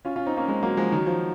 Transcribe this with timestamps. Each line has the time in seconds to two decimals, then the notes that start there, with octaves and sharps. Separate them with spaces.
0.05 C#4 F4
0.16 C#4 F4
0.26 C4 D#4
0.37 A#3 C#4
0.48 G#3 C4
0.63 F#3 A#3
0.77 F3 G#3
0.92 D#3 F#3
1.06 F3